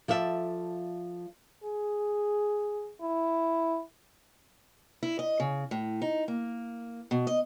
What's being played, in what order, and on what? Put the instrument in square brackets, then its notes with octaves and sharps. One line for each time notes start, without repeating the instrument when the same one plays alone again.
[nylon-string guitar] F3 A4 D5 E5
[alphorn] G#4
E4
[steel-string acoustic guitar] E4
D#5
C#3
A2
D#4
A#3
B2
D#5